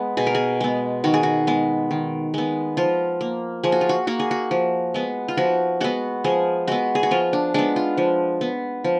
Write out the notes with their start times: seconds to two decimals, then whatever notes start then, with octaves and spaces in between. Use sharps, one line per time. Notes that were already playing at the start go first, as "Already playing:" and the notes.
Already playing: G#3 B3
0.17 B2 G#4
0.27 A#4
0.35 G#4
0.61 G#3 B3
1.04 D#3 F#4
1.14 G#4
1.23 F#4
1.47 G#3 B3
1.91 D#3
2.34 G#3 B3
2.77 F3 F4
3.21 A#3
3.63 F3 G#4
3.72 F#4
3.81 F4
3.89 F#4
4.07 A#3 F#4
4.20 G#4
4.31 F#4
4.51 F3
4.94 G#3 B3
5.28 F4
5.37 F3 F#4
5.81 G#3 B3 F#4
6.24 F3 G#4
6.68 G#3 B3 F#4
6.95 G#4
7.03 F#4
7.11 F3 F4
7.33 D4
7.54 G#3 B3 D4
7.76 F4
7.97 F3
8.41 B3
8.84 F3